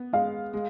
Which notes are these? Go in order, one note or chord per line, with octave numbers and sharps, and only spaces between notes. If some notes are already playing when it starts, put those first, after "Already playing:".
Already playing: B3
G#3 F5
G#3